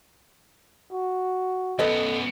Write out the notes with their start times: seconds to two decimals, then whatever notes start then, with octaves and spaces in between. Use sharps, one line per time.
0.92 F#4
1.79 F#2 B3 A4 B4 D#5